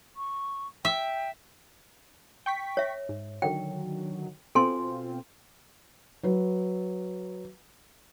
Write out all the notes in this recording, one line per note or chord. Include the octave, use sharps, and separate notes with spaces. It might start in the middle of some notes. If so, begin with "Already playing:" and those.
C#6
E5 G5
G5 C#6 B6
C#5 E5
G#2
D3 D#3 F#3 G5
B2 C4 F4 A4 G#5 C6
F#3 B4